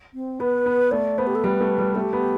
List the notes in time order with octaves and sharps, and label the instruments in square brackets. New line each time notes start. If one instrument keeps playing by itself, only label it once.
[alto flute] C4
[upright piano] B3 [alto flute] B4
[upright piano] B3
[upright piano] A3 [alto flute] D5
[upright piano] B3 [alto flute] C5
[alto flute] G4
A4
[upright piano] G3 [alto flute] B4
[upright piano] A3
G3
[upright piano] A3 [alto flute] G4
[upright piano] B3